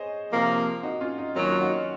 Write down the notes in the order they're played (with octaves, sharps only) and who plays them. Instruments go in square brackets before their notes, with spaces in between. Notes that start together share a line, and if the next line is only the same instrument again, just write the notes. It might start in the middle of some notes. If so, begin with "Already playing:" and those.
Already playing: [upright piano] G#4 C5 C#5 D#5
[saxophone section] C3 F3 A#3
[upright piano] D#4 F#4
C#4 F4
D#4
[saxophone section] D#2 D#3 F#3 [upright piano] C#4 F4
[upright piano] F4
D#4 F#4